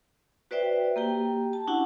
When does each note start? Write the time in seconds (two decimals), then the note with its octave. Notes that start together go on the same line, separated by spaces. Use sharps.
0.51 F#4 B4 C5 D5 E5 G5
0.96 A#3 G4 G5
1.53 A5
1.67 C#4 D4 E4 F#4 F#5